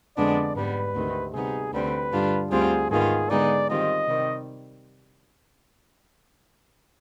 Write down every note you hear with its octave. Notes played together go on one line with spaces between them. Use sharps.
F2 D3 G#3 B3 D4 D5
G#2 G3 B3 B4
D2 C3 D#3
C3 G3 B3 D#4 G#4
D2 D3 G3 C4 B4
G2 D3 G3 D4 F4
D2 D3 G3 C4 F4 G#4
G#2 D#3 B3 F4 G#4
D3 G#3 B3 D#4 G#4 D5
D#3 G3 C4 F4 D#5
C3 D#3 G3